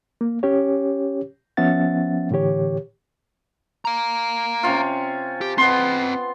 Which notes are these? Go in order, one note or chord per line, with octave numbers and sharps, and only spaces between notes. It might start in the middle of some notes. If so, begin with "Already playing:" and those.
A#3
C#4 G4 C#5
F3 B3 C#4 E5 F#5 A6
A2 D3 E3 G4 C#5
F5 A#5
C3 C#4 F4
G4
B3 C4 D#5 C6